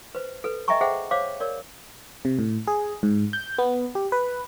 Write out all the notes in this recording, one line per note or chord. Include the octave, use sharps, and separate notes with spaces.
B4 C5
A4 B4
D#5 E5 G5 G#5 A#5 C#6
G#4 C5 E5 F#5 G5
C5 C#5 F5 D6
A#4 C#5 D5
C3
A2
G#4
G#2
G6
B3
G4
B4